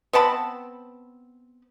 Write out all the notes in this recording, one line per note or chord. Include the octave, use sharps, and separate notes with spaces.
B3 C4 A5 B5